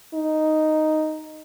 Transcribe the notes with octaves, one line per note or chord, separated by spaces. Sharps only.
D#4